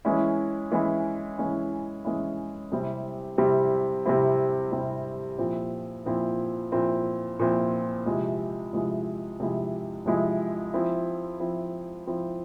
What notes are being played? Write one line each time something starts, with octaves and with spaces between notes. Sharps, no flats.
E3 G#3 C#4 E4
E3 G#3 C#4 E4
E3 G#3 C#4 E4
E3 G#3 C#4 E4
C3 G3 C4 E4
C3 G3 C4 E4
C3 G3 C4 E4
C3 G3 C4 E4
A#2 F3 C4 E4
A#2 F3 C4 E4
A#2 F3 C4 E4
A#2 F3 C4 E4
C3 F3 G#3 E4
C3 F3 G#3 E4
C3 F3 G#3 E4
C3 F3 G#3 E4
F3 C4 E4
F3 C4 E4
F3 C4 E4